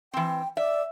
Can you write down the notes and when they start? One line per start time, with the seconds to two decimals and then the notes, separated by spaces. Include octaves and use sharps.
0.13 E3 C4 G5
0.57 D5 E5